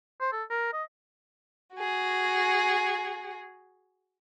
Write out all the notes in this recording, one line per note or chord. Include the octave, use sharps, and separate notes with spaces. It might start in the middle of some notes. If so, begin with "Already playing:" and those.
C5
A4
A#4
D#5
F#4 G#4